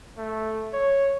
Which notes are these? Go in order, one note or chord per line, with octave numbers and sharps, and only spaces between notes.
A3
C#5